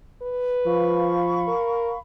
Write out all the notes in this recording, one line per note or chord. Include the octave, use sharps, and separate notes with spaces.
B4
F3 F5 B5 C#6
A#4